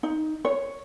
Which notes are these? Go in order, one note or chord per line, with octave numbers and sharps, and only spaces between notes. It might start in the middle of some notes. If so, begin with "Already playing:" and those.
D#4
C#5